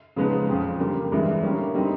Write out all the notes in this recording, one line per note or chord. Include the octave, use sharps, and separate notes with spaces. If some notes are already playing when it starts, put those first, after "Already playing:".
C#3 F3 G#3 B3 D#4
F2 C#3 F3
D3 G3 A#3
G2 E3 G#3
D3 G3 A#3 C#4
D3 G3 C4 D#4